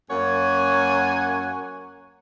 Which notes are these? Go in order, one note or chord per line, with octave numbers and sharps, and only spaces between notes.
F#2 A#3 C#5 F#5 G#5